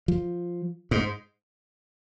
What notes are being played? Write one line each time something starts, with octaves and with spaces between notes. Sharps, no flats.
F3
G#2